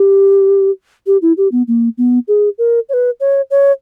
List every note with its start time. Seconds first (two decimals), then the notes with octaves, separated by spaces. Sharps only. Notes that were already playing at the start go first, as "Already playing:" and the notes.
Already playing: G4
1.07 G4
1.22 E4
1.37 G4
1.52 B3
1.68 A#3
1.98 B3
2.28 G#4
2.58 A#4
2.89 C#5
2.94 B4
3.20 C#5
3.51 C#5